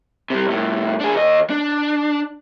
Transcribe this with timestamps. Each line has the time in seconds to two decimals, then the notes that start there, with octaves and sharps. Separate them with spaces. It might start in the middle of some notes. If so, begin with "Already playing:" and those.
0.30 C3 G3
0.47 C2 A2
1.00 D4 G#4
1.14 D#2 D#5
1.50 D4